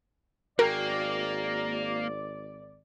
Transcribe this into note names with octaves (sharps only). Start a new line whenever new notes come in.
G#1 A#3 F#4 G#4 A#4 D5 G5